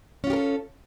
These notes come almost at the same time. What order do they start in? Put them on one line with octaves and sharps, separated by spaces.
C#4 F4 G4 A#4 A4